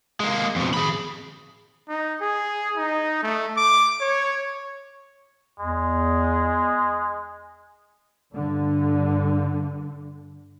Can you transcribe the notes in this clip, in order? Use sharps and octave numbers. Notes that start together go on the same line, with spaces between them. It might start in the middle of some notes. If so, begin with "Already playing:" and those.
G#3 A#3
F2 B2
G#4 B5
D#4
G#4
D#4
A3
D6
C#5
E2 G#3
G2 D3